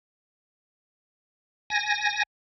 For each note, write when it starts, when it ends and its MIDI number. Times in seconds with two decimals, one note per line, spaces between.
1.70 2.23 80
1.70 2.23 94